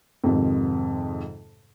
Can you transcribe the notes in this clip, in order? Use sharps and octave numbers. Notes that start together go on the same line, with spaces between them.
F2 G#2 C3 D#3